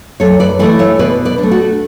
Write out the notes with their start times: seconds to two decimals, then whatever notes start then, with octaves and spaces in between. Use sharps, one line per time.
0.20 F#2 A4 C#5
0.40 B4 D5
0.59 E3 A3 E4 B4 D5
0.79 C#5 E5
0.99 B2 B4 D5
1.25 B4 D5
1.38 D4
1.43 A3
1.51 F#4